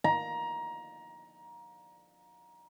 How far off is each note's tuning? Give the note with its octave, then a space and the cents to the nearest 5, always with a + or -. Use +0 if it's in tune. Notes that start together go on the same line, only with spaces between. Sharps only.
A#5 +20